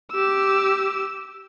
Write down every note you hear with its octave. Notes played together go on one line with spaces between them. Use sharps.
G4 E6